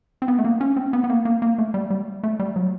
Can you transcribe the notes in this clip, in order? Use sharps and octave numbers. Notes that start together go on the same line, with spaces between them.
C4
B3
A3
A#3
C#4
C4
B3
B3
A#3
A#3
A#3
A3
G3
G3
A3
G3
F#3